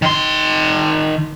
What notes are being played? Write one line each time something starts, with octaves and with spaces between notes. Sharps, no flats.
D#3 C6